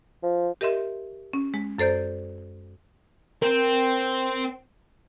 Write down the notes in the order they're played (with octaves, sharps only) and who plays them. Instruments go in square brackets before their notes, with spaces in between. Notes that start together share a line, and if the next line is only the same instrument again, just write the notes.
[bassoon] F3
[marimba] G4 A#4 D#5 E5 C6
C#4
G#3
F#2 A4 C5 D5 G6
[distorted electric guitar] C4 [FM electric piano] A#4